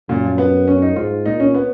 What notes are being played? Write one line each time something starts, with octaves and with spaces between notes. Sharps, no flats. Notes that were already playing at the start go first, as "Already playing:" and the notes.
F#2 A#2
F3
B3
C#4
D#4
G#2 F4
A#2 D#4
C#4
B3